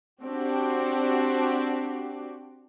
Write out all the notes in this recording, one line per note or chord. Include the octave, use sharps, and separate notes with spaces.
C4 D4 F#4 G4